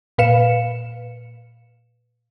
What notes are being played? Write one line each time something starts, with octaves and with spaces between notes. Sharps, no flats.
A#2 B4 F5 C#7 E7